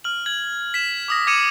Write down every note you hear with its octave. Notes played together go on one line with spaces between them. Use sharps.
F6 F#7
G#6 F#7
B6 E7
D6 D#6 A#6
D6 G#6 B6 C#7 D#7 E7